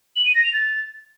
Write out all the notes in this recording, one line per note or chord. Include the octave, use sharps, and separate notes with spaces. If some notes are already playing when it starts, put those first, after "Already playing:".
F#7
D#7
A#6
F7
A6